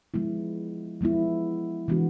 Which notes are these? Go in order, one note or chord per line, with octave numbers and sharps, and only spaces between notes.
F3 G#3 B3 E4
F3 G#3 B3 E4
E3 G#3 B3 D4 F#4